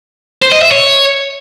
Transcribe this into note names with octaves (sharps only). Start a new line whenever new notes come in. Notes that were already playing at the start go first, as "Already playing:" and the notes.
C5
D#5
E5
C#5